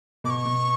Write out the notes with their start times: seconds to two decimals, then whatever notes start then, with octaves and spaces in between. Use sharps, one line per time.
0.24 B2 D6
0.30 C#6
0.45 B2